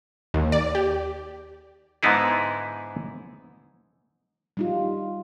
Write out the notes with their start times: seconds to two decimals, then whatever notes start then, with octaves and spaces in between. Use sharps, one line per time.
0.34 D#2
0.52 D5
0.75 G4
2.03 G#2 D3 B3 D#4 E4 G#4
4.57 G3 D#4 F4